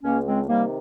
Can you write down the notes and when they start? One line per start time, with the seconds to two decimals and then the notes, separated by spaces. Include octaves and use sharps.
0.04 C#2 A#3 C#4
0.25 G#3 C4
0.47 C3 D#3 G3 A#3